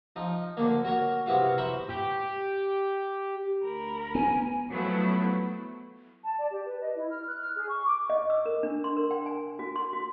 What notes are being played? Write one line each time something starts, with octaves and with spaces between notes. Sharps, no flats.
F3 D#4
D2 D3 A#3
F#4 A#4 C#5
C3 B3 E4 F#4 F5
C5 E5 A#5 B5 C#6
G4
D2 A#4 B5
B3 G#5
F3 F#3 A3 B3 E4
A5
D5
G4
B4
D#5
E4
F6
F#6
F6
G#4
C#6
D6
D#5
E6
A#4
D4
C6
A#4
G5
G#5
F#4
C6
F#4